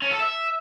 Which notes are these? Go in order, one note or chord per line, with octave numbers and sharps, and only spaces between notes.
C#4
A4
E5